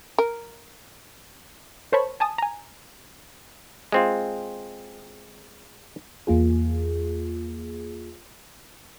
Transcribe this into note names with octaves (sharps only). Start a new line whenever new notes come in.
A#4
A#4 C5 C#5 A5 B5 C#6
G#5 A5 D#6
G#5 A#5
G#3 C4 F4
E2 A#3 F4 G#4